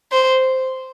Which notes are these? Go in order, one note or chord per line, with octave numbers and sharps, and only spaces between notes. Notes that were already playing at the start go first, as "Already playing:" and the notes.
C5